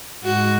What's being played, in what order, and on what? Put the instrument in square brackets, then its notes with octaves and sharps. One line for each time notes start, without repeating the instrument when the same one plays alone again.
[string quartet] G#2 [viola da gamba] F#4